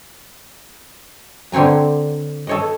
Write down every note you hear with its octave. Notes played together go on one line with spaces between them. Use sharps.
D3 C4 C#5 G#5 A#5
A4 C#5 D#5